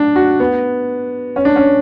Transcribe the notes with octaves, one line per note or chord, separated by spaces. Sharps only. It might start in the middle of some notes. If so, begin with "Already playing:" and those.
Already playing: D4
F#4
B3
C#4
D4
C#4